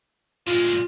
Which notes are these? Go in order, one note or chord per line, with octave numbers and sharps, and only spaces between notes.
A#2 G#3 F4